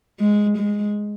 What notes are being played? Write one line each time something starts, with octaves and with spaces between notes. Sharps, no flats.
G#3
G#3